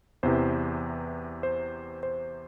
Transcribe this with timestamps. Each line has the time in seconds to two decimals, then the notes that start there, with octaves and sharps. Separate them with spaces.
0.23 E2 C3 E3 C5
1.43 C5
2.03 C5